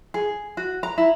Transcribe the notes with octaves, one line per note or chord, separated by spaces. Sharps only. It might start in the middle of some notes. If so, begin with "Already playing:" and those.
G#4
F#4
A#5
E4